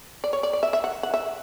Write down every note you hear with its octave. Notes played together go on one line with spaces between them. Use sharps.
D5
C#5
D5
D5
E5
E5
F#5
F#5
E5